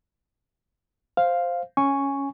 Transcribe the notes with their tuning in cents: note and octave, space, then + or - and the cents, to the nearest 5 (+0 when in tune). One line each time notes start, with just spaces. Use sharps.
C5 +0 F5 +0
C#4 +0 G#5 +0 C#6 +0